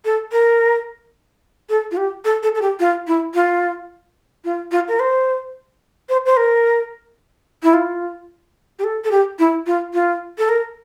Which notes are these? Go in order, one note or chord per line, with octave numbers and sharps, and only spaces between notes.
A4
A#4
A4
F4
G4
A4
A4
A4
G4
F4
E4
F4
F4
F4
A#4
C5
C5
C5
A#4
E4
F4
G4
A4
A4
G4
E4
F4
F4
A4
A#4